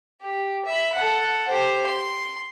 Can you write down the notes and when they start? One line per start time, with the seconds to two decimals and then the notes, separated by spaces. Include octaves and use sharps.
0.22 G4
0.66 E5 B5
0.94 A4 F#5
1.48 G4 C5
1.86 C6